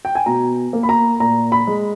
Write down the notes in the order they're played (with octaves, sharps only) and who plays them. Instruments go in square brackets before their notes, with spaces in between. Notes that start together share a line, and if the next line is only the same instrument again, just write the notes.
[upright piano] G5
G#5
B2 A#5
A#3
B5
A#5
A#2 A#5
B5
G#3